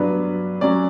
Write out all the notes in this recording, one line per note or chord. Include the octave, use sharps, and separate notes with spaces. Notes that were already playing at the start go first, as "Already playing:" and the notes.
Already playing: G2 F#3 B3 D4 B4
F#3 C#4 D5